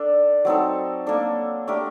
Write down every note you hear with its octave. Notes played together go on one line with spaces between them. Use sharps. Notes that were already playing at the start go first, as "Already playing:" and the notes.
Already playing: D4 A4 D5
F#3 C4 D#4 A4
A#3 D4 A4
A3 D4 G4 A#4